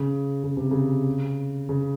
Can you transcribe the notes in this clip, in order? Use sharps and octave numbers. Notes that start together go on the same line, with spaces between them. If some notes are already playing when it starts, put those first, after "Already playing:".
Already playing: C#3
C#3
C3
C#3
C#3